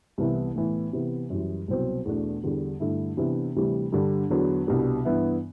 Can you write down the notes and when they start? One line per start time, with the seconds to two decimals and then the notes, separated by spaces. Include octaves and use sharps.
0.18 C2 C3 E3 B3 E4
0.56 A2 E3 B3
0.93 C3 E3 B3
1.30 F#2 E3 G3
1.68 C2 B2 F#3 C4
2.05 E2 B2 A3 D4
2.43 E2 D3 G3
2.80 G2 D3 A3 E4
3.17 C3 E3 B3 D4
3.55 D2 C3 E3 G3
3.92 G2 D3 G3 D4
4.30 E2 D3 F#3 B3 D4
4.67 C2 B2 G3 D4
5.05 G2 E3 B3 E4